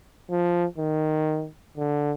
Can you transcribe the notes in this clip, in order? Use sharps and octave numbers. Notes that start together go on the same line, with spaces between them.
F3
D#3
D3